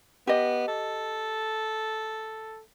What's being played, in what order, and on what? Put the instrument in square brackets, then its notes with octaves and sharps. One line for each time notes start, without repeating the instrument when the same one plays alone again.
[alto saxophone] B3 [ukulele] G4 D#5
[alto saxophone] A4